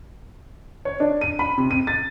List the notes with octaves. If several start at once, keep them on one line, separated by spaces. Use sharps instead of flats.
C#5
D4
D#7
B5
C3
D#7
A6